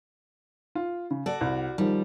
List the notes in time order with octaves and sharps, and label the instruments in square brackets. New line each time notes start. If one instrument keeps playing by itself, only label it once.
[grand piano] F4
C#3
[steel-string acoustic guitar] F#4 D5 [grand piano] A4
[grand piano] C2
[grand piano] D#3 F3 [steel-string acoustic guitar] G3